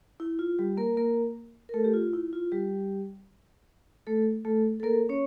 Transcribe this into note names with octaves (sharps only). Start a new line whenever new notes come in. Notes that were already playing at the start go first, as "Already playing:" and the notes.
E4
F4
G3 G4
A#3 A#4
A#3 A#4
A#4
A3 A4
G4
F4
E4
F4
G3 G4
A3 A4
A3 A4
A4
A#3 A#4
C#4 C#5